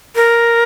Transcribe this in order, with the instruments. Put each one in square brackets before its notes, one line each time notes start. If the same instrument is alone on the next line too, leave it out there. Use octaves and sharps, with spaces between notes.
[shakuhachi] A#4